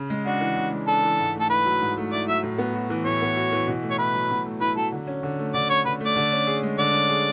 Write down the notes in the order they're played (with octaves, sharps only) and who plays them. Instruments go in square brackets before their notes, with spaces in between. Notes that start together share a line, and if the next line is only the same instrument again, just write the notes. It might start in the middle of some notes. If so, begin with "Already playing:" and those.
Already playing: [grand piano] C#3
G#3
[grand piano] D4 [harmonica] F#4
[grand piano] E3
C#3
G#3
[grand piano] D4 [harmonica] A4
[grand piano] E3
G#2
A3
[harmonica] A4
[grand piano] E4 [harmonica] B4
[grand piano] F#3
G#2
A3
[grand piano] E4 [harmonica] D5
[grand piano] F#3 [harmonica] E5
[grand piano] A2
B3
F#4
E3
[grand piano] A2 [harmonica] C#5
[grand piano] B3
F#4
E3
B2
A3
[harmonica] C#5
[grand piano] E4 [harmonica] B4
[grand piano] F#3
B2
A3
[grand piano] E4 [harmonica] B4
[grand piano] F#3 [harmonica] A4
[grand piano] D3
C#4
D3
A3
[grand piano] D3 [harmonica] D5
[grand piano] C#4 [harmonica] C#5
[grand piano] D3 [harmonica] B4
[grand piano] A3
[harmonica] D5
[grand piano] D3
C#4
G#4
G#3
[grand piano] D3 [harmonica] D5
[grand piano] C#4
G#4